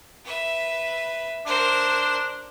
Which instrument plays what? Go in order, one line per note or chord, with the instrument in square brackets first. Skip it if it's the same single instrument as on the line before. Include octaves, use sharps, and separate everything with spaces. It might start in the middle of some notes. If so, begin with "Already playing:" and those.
[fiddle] B4 E5
[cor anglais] D4 [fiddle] A#4 C5